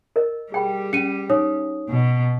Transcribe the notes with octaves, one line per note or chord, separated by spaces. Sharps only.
A#4 D#5
G3 G#4 G5 B5
C#4 C#7 D#7
D#4 C#5 D#6
B2